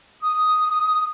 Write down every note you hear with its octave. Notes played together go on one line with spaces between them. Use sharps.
D#6